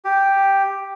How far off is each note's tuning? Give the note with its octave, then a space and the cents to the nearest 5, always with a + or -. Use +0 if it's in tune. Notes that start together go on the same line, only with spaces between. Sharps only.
G4 +0